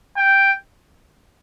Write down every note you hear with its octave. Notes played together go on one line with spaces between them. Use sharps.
G5